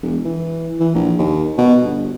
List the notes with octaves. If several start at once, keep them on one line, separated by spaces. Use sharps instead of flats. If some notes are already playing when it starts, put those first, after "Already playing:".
E1
E3
E3
A#1
D#2
B2
G1